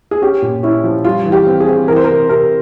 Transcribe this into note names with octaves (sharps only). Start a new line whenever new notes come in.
G#4
C#4 G4
A#2
C#4 E4
F3
G3 F4
E3
G4
C4
G#4
C4
E3 A#4
C5
A#4
C3
C3 A#4